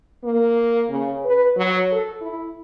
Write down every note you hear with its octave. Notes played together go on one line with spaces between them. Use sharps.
A#3
C#3
B4
F#3
A4
E4